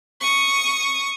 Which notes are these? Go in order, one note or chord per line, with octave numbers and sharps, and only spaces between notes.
C#6 D#6